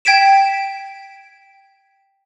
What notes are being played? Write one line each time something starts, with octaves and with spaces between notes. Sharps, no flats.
G5 G#6 B6 D7 E7